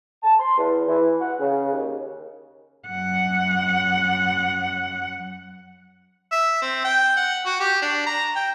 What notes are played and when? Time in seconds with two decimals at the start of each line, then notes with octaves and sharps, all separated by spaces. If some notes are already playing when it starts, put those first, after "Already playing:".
0.23 A5
0.39 C6
0.58 E2
0.88 E3
1.20 F#5
1.40 C#3
1.72 D#2
2.88 F#2 F#5
6.32 E5
6.62 C4
6.84 G5
7.17 F#5
7.46 F#4
7.60 G4
7.82 D4
8.06 A#5
8.36 G5